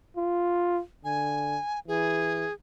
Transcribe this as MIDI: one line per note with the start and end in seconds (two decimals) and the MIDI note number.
0.17 0.80 65
1.04 1.58 50
1.04 1.80 80
1.88 2.46 52
1.88 2.53 68